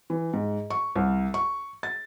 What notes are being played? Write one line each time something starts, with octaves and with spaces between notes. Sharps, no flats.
E3
G#2
C#6
C2
C#6
A6